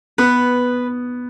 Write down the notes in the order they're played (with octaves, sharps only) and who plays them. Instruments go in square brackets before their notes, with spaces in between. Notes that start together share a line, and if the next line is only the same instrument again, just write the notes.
[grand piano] B3 [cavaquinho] B4